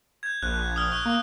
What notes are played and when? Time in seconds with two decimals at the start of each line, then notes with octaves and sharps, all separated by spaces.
0.23 G6 G#6
0.43 A#1 F#6
0.76 D#6 F6
0.91 C#6 F6 G6
1.05 A#3